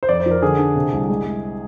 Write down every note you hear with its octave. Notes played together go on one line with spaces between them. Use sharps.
C5
F2 D5
C5
F3
A#4
D3 G#4
D4
C3
C2
G#3
G#3